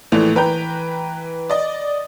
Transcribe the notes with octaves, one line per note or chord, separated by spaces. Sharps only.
A#1 A2 E3 A3 F7
E3 B4 G5 A#5 G6
D5 D#5